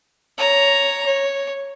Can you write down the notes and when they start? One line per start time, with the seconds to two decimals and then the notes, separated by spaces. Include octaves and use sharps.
0.38 C#5 A#5
1.06 C#5